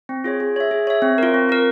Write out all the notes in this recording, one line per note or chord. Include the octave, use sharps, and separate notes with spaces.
C4
F4 G#4 C#5
G#4
C#5 E5
G#4
C#5 E5
C4
F4 A#4
C4
F4 A#4